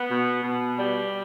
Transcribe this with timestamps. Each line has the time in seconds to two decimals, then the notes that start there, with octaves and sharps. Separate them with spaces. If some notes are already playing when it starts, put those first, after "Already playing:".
Already playing: B3
0.09 B2
0.43 B2
0.76 G3